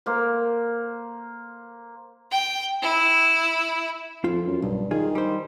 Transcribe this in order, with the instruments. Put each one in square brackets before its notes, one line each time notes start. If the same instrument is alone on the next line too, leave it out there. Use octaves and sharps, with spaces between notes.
[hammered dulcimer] A#3 C5
[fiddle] G5
E4
[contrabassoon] F2 [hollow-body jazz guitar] F4
[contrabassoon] F#2
[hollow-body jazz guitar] B1 [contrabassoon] G2
[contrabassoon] D#3 [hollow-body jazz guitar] F4 G#4
[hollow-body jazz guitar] G3 C5